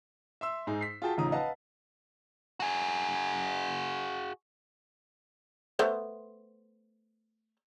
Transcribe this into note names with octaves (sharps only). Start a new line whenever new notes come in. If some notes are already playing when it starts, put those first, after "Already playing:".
E5 C6 E6
G#2 D#4 G#4
B6 C7
F4 F#4 G#4 G5 A5
A1 C#3 F3 D#4 A#5 D#6
B4 D#5 F5 F#5 A5
F#4 G#4
A3 B3 C5